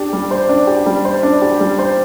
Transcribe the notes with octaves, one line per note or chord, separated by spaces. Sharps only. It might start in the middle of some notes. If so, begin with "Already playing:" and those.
Already playing: D4 G4
G3
C5
D4
G4
G3
C5
D4
G4
G3
C5